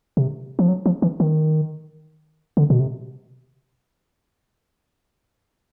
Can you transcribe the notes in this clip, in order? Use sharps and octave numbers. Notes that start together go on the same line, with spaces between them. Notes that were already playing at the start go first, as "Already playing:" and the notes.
C3
F3
F#3
F3
E3
D#3
D3
B2
C3